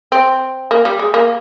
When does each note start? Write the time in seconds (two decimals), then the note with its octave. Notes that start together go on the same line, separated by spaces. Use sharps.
0.12 C4
0.71 A#3
0.85 G3
0.99 G#3
1.14 A#3